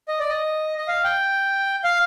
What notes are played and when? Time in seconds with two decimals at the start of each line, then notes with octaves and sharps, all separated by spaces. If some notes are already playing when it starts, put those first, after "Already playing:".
0.08 D#5
0.20 D5
0.29 D#5
0.78 D#5
0.88 F5
1.04 G5
1.84 F5